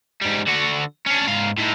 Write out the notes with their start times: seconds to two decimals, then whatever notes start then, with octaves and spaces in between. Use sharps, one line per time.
0.22 G#2 G3
0.47 D3 F#4
1.07 C#4 D4
1.28 G#2 F5
1.58 A2 D#4